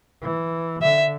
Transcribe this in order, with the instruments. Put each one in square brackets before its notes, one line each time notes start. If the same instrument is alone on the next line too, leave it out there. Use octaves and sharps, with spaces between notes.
[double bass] E3
[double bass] D3 [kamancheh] E5